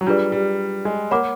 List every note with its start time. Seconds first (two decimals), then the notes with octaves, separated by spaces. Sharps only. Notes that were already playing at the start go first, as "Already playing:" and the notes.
0.01 F#3
0.07 G3 D4 F4 G#4 B4 D5
0.32 G3
0.85 G#3
1.11 A#3 C#5 F#5 B5 D6